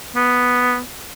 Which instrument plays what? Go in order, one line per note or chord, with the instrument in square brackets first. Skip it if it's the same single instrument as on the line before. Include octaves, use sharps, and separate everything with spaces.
[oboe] B3